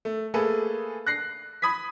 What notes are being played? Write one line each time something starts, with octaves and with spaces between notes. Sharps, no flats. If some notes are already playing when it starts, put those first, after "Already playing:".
A3
A3 A#3 G#4 A4 B4
F#6 A#6 C7
B5 D#6 G#6 B6